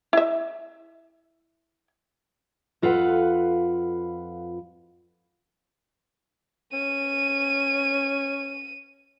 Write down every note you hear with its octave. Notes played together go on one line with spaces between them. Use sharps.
E4 E5
F2 F4 A4 B4 F#5
C#4 D#7